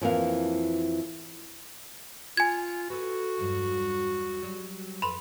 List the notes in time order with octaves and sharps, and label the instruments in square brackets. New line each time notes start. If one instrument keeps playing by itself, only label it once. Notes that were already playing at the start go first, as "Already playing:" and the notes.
[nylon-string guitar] F2 E3 A#3 F5
[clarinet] F4 [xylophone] G#5 G#6
[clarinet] F#4 [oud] A4 B4
[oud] E2 G2 F#3
F#3 G3
[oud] F2 A4 B4 [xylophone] B5 C6